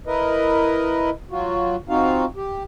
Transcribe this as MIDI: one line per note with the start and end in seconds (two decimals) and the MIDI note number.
0.07 1.10 64
0.07 1.10 70
0.07 1.10 71
0.07 1.10 75
1.31 1.76 54
1.31 1.76 65
1.31 1.76 66
1.89 2.25 60
1.89 2.25 63
1.89 2.25 65
1.89 2.25 66
1.89 2.25 77
2.36 2.63 67